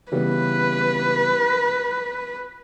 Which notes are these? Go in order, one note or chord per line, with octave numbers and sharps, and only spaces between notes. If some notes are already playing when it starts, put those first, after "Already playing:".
C#3 E3 G3 B3 B4